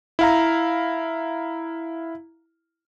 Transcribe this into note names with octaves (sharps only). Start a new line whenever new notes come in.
E4 F5 A#5